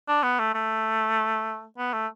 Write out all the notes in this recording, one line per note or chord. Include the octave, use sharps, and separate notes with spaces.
D4
B3
A3
A3
B3
A3